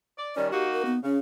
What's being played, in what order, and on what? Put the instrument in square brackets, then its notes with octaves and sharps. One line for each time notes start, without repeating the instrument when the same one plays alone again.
[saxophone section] D5
[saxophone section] D#3 G3 C#4 [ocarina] D5
[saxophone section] A#3 D#4 F#4 [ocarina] G4
[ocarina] A#4
B3
[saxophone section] C#3 [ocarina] C#4